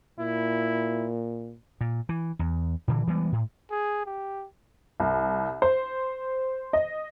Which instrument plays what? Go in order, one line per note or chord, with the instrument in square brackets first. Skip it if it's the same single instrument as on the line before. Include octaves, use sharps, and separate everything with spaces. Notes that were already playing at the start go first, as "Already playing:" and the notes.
[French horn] A#2 [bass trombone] E4
[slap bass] A#2
E3
E2
A#2 D3 E3
E3 G3 G#3 B3
A2
[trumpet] G#4
G4
[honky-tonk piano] C2
C5
D#5